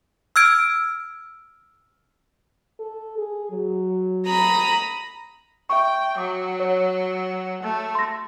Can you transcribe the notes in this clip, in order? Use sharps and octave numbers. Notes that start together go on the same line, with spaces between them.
E6 F6 G#6 D7
A4
G#4
F#3
A#5 B5 D#6
E5 G5 C#6
F#3 D6
C#5
A3
C6 A#6